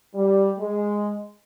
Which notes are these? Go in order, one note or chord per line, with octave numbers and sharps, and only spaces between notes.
G3
G#3